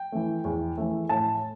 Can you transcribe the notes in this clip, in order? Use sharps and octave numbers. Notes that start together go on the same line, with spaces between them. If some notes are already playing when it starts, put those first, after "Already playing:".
Already playing: G5
E3 A3
E2
E3 A3
A2 A5